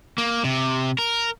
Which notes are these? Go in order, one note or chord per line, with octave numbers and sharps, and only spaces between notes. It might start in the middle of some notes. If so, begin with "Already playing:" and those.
A#3
C3
A#4